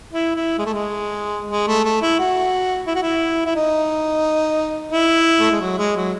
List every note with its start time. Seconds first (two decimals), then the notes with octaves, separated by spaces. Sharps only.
0.13 E4
0.36 E4
0.58 G#3
0.66 A3
0.74 G#3
1.51 G#3
1.68 A3
1.85 A3
2.02 E4
2.19 F#4
2.87 E4
2.95 F#4
3.02 E4
3.46 E4
3.56 D#4
4.92 E4
5.40 A3
5.51 G#3
5.61 F#3
5.78 G#3
5.96 F#3